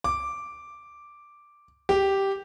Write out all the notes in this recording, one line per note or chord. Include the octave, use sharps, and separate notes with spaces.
D6
G4